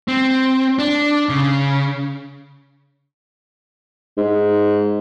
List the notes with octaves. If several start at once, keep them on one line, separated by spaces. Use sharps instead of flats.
C4
D4
C#3
G#2